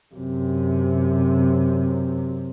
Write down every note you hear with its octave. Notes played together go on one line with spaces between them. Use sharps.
F#2 C3